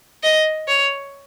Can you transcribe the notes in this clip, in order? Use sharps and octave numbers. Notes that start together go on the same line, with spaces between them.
D#5
C#5